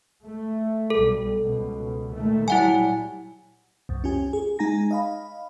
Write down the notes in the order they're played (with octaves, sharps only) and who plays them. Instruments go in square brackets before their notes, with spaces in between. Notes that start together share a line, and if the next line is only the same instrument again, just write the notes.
[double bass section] A3
[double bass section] B1 G3 [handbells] A4
[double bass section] C#2 B2
A#2 D#3 A3
[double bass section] F#3 G3 [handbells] E4 F#5 G#5
[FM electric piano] C2 F#2
C#4 F4 G4 G#5
G#4
G#3 D#4 G#5 A#5 A#6
D#5 F5 B5